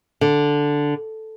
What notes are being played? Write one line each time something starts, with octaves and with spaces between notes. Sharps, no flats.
D3